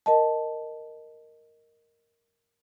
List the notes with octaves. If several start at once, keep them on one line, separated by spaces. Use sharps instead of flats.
A#4 D#5 A5